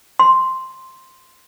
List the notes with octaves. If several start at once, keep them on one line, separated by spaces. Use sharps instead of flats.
C6